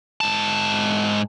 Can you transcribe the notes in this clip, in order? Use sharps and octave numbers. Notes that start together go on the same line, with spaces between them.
G#2 A5